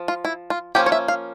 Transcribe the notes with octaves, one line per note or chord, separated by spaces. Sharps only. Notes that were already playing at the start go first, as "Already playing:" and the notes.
Already playing: F3
F4
E4
F4
F3 A#3 C#4 G4
C#5
E5
F5